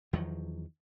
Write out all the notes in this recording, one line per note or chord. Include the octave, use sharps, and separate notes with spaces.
E2 D#3 F3 F#3